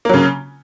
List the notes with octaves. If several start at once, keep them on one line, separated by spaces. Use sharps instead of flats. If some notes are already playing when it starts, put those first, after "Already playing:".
C#3 F#3 A#3